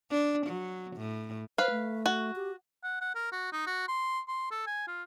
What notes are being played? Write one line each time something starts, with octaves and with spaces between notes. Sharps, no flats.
D4
F#3
A2
B4 C5 F5
A3
F#4
G4
F#5
F#5
A#4
F#4
D#4
F#4
C6
C6
A4
G#5
F4